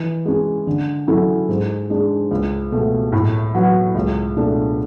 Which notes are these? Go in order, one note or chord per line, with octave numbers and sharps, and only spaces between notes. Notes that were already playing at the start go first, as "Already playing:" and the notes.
Already playing: E3
G#3 C#4
D3
F#3 C#4 E4 A4
G#2
G#3 D4
C#2
B2 A3
A2
F#3 B3 F#4
C#2
B2 A3 D4